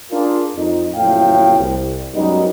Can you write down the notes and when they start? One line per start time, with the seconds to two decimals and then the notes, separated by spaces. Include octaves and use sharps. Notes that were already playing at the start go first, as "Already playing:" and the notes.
0.11 D4 F4 G#4 A#4
0.55 F2 D#4
0.95 F#1 F2 A2 F5 G5
1.59 C2
2.14 F#2 G3 G#3 B3 D#4